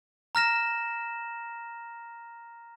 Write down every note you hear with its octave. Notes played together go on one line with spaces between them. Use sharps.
A#5 F6 A#6 E7